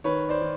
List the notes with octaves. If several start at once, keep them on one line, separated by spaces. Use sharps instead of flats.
D#3 B4 C#5
C5 D5
D#3